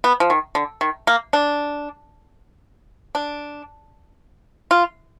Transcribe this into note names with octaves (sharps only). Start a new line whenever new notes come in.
B3
F3
D#3
D3
D#3
A#3
D4
D4
F4